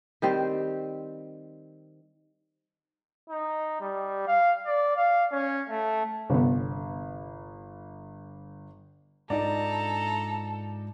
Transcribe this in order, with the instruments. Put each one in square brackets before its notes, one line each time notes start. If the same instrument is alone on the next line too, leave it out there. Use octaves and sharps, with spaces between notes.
[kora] D#3 G3 C4 C5
[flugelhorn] D#4
G3
F5
D5
F5
C#4
A3
[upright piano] G1 [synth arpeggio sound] C3 B3
[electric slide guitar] G#2 D4 F4 [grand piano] D#4 D5 [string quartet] A4 [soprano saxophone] A#5